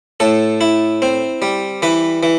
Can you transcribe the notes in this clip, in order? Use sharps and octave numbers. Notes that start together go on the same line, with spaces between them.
A2 A4
E4
C4
G3
E3 B4
E3